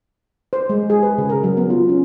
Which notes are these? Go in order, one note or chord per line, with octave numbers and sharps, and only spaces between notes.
C5
G#3
G#4
B4
C#3
A#4
F#3
B3
F4
C#4